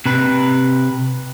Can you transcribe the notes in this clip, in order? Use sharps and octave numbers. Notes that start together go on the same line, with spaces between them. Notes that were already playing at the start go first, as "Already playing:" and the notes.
C3 B4